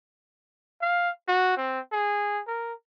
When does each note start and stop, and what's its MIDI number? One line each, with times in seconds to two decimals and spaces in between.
0.82 1.10 77
1.28 1.57 66
1.57 1.80 60
1.92 2.41 68
2.48 2.73 70